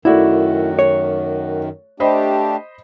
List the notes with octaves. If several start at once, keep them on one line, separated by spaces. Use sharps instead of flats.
F#2 D#3 A3 E4 F#4 D5
C#5
A3 D4 G4 C5 D#5 B5